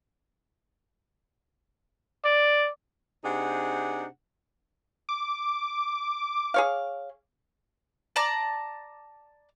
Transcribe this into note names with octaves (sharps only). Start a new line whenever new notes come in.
D5
C3 D4 D#4 G#4 F#5
D6
G#4 C#5 F5
D5 A5 A#5 D6